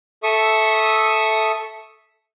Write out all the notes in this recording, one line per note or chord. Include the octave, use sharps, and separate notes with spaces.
A4 E5 C#6 D#6